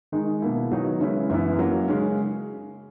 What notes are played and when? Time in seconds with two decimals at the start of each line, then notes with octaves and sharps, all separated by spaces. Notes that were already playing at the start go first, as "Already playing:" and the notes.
0.12 D#3 G#3 D#4
0.42 B2 A#3 E4
0.72 D#3 F#3 B3 D#4 F#4
1.00 C#3 G#3 C#4 E4 B4
1.30 F#2 E3 B3 E4
1.59 F#3 A#3 C#4
1.88 C#3 G#3 C#4